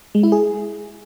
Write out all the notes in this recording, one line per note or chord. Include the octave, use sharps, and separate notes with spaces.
G#3
E4
G#4